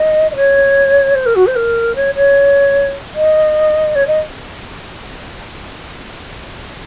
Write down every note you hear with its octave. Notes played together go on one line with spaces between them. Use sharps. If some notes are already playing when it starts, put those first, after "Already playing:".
Already playing: D#5
D#5
C#5
C5
A#4
F#4
C5
A#4
C#5
C#5
D#5
C#5
D#5